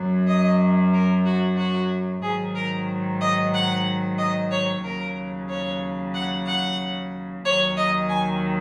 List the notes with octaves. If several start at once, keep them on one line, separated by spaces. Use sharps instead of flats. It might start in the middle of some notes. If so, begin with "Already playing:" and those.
Already playing: F#2 F#3
D#5
A#4
F#4
F#4
G#2 D#3 F#3 G#4
A#4
D#5
F#5
D#5
C#5
D#2 C#3 F#3 A#4
C#5
F#5
F#5
D#2 D#3 F#3 C#5
D#5
G#5